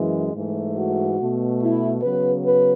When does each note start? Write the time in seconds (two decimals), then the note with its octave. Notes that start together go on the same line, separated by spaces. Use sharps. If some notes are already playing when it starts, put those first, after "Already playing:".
Already playing: F#2 E3 G#3
0.35 G#2 E3 A3
0.76 F#4
1.19 B2 A3
1.61 E4
2.02 C#3 F#3 B3 B4
2.44 B4